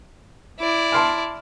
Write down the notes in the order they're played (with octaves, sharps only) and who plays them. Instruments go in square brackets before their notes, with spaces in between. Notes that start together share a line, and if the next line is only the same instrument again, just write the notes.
[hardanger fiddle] E4 D5
[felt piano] A5 C6 F6